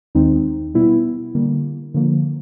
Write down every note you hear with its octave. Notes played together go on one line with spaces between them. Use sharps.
D#2 D#3 G#3 C4 D#4
B2 G3 B3 E4
D3 G3 A#3
D3 F3 A#3